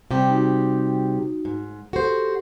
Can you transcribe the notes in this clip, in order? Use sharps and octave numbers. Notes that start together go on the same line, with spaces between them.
C3 G3 G4 C5 G5
D#4 F#4
G#2
F#4 G4 A4 C5